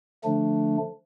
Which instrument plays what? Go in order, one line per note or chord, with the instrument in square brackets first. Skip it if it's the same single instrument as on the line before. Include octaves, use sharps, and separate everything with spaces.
[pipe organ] D3 F3 A3 D4